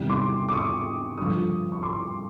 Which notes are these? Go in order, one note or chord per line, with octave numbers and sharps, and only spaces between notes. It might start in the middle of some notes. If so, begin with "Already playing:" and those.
Already playing: E2 C3 D#3 G3
C6 D6
D6
C#6 D#6
G2 D3 F3 C#6 D#6
C#6
C6 D6